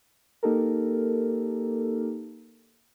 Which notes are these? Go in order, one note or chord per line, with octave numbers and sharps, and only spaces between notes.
A#3 D#4 G4 A4 A#4